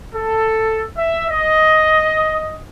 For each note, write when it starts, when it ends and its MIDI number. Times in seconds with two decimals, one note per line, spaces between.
0.12 0.84 69
0.96 1.23 76
1.29 2.59 75